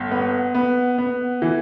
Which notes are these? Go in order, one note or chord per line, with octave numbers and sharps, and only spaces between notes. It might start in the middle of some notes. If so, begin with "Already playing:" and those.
Already playing: G1
B3
B3
B3
E3